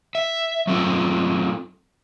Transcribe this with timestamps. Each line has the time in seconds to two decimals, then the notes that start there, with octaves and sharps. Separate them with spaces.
0.15 E5
0.67 F#3 A3 C4 F4 A4